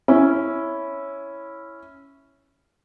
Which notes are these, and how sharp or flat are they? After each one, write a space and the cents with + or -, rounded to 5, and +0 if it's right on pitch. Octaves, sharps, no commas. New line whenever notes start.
C#4 +0 E4 +0